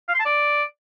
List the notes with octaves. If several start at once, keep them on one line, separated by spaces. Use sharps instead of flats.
F5
C6
A5
D5